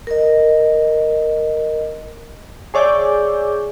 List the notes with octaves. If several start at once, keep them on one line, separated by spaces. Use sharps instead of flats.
A#4 D#5
G#4 C#5 D5 E5 G6